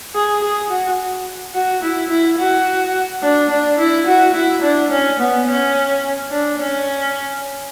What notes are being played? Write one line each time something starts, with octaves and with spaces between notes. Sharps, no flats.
G#4
G#4
F#4
F#4
E4
E4
F#4
D4
D4
E4
F#4
E4
D4
C#4
B3
C#4
D4
C#4